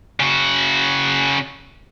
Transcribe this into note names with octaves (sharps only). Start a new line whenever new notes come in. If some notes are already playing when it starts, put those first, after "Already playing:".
C#3 F#4